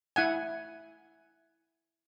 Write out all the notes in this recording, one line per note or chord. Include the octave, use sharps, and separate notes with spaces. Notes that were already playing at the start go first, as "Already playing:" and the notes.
E4 F#5 G#5